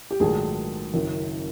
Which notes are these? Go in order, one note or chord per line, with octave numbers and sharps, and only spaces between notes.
G4
A#1 G#2 D#3 F#3 A3 G#4
F#1 F#2 D#3